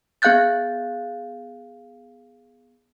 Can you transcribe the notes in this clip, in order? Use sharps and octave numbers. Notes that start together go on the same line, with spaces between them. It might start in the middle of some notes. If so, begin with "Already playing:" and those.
B3 G#4 F5 F#6 G6 A6